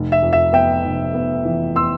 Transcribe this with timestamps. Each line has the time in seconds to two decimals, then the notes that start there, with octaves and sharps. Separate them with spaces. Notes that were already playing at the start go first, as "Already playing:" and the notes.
Already playing: F1
0.12 E5
0.23 F2
0.33 E5
0.53 B3 E5 G5
0.84 F1
1.14 B3
1.45 E3
1.76 B3 C6 E6